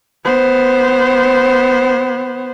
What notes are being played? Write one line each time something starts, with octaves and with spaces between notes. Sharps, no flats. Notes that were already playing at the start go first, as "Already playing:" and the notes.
B3 C5